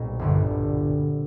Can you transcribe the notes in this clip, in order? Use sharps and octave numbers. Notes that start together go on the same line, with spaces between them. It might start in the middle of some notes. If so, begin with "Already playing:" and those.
Already playing: B1 A#2 G3 C4
G1 G2 D3